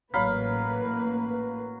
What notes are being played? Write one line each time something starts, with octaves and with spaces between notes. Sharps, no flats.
A1 F#3 A#3 B4 F5 B5